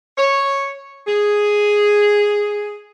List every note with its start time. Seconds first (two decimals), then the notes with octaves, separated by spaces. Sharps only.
0.18 C#5
1.07 G#4